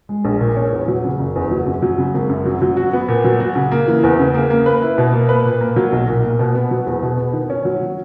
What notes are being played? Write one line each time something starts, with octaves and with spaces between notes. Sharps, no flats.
G#3
A#1
A#2
C#4
E2
F#3
C#3
F#1
E2
F#3
F#2
F#3
C#3
G#1
F#2
F#3
F#3
F#4
B3
A#2
F#3
F#4
C#3
A#3
E3
E2
C#3
A#3
A#3
B4
E4
B2
A#3
B4
A#2
A#3
F#3
B1
A#2
A#3
B2
B3
F#3
E2
B2
B3
D#3
C#4
F#3